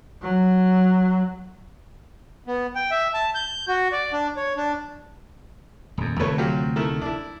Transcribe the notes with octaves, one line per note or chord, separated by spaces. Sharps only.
F#3
B3
G5
E5
A5
G6
F#4
D5
D4
C#5
D4
D#1 F2
D2 C3 F3 A3 B4 C#5
F#3 F4 G4
D#3 A3 E4
D4 E4